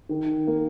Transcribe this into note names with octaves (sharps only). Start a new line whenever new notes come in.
D#3
A#3